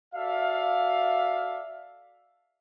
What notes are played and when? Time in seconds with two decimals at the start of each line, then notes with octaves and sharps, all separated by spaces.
0.14 F#4 A4 D5 E5 F5